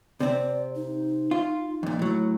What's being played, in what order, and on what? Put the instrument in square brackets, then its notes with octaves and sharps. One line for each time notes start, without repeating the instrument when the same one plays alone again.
[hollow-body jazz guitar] C3 C4 [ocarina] D5
[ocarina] D#4
[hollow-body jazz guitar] F4
F2 A#2
A2 F#3